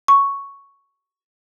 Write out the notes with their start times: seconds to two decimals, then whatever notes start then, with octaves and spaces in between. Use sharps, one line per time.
0.08 C#6